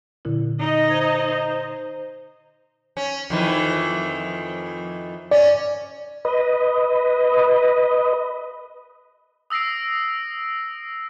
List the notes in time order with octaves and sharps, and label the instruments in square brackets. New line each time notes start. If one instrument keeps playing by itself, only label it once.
[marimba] A#2 D3 E4
[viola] D#4 D#5
[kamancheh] C5 [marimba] G#6
[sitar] C#4
F2 D#3 E3
[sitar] C#4 [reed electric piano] D5
[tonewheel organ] B4 D#5
[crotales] D#6 E6 A#6 C7 D7